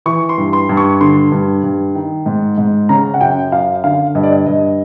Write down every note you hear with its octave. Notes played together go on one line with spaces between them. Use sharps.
E3 C#6
C6
G2
C6
G2
C#6
D3 C6
G2
G2
D#3
G#2
G#2
C#3 A#5
F#5
F#2 G5
F#2 F5
D3 F5
G2 D#5
D5
D#5
G2 D#5